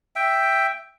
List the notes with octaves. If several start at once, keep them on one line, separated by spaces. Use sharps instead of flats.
E5 G5